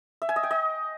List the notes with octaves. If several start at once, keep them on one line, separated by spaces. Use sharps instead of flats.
E5
G#5
D#5
G5
D#5